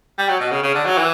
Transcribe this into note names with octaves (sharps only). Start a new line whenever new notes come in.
G3
F#3
B2
C#3
C#3
D3
F#3
E3